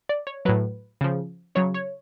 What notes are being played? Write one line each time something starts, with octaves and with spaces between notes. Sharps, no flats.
D5
C#5
A2 F#3 B4
C#3 F3
C#3 F#3 C#5
C#5